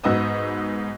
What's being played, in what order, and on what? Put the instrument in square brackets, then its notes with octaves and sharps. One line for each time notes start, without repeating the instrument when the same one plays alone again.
[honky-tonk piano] G#2 B3 F#4 D#5 D#6 E6